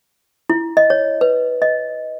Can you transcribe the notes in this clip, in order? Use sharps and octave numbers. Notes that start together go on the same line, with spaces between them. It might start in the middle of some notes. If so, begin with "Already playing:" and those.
E4
D#5
C#5
B4
D#5